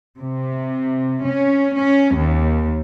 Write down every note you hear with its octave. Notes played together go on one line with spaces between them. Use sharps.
C3
C#4
C#4
D#2